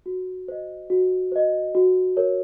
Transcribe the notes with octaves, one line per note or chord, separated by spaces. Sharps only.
F#4
C5 D#5
F#4
C5 D#5
F#4
A#4 C#5